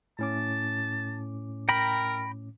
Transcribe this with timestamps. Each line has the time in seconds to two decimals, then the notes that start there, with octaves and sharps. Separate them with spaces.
0.19 A2 C#4 A5 D6
1.69 A#4 G5 A#5 B5